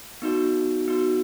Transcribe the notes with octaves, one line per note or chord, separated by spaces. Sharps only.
B3 D#4 F#4
B3 D#4 F#4